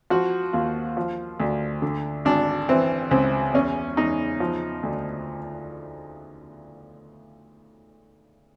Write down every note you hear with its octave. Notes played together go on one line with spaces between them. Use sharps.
F3 F#4
D#2 F4
F3
D2
D3
G#1 D4
E3 C4
C#2 C4
E2 C#4
E2 D#4
F3
D2